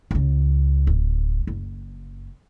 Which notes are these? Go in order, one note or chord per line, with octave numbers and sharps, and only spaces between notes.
C#2 C#3
D1
F#1